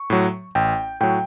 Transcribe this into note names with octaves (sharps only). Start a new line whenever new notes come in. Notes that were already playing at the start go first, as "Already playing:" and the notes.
Already playing: C#6
A2 F#3
A1 G5
A2 F#3 G5